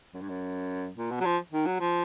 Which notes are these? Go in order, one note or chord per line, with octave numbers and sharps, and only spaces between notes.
F#2
G2
F#2
A#2
B2
F#3
F3
D#3
F#3
F3